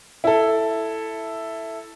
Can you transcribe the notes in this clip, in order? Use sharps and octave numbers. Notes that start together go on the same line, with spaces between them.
E4 A4